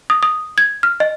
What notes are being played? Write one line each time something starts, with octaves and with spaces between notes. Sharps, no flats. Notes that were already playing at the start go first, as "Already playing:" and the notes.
D#6
D#6
G#6
F6
D#5